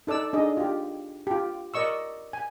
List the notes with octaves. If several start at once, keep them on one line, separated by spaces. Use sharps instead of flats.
D#4 A4 D5 E6
D4 D#4 G#4 D#5
F4 G4
F4 G4
A#4 D5 D#5 C#6 E6
G#5